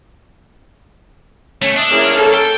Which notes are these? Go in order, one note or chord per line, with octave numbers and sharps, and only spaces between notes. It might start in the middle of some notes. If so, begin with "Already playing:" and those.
A3 C#4
D4 D#5 E5
A#3 C#4 E4 G#4
A4
G5